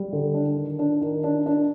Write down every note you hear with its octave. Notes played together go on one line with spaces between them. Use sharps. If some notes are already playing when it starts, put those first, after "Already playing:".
Already playing: G3
D3
D4
D#3
D4
D#3
D4
D4